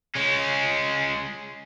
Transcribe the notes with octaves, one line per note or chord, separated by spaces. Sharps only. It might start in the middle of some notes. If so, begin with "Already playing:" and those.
G#3 C#4